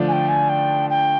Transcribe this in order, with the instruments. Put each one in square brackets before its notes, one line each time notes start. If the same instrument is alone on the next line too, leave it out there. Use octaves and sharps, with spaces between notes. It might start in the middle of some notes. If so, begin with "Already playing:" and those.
Already playing: [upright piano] D3 F3 A3 D4
[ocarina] G#5
G5
G#5
G5
G5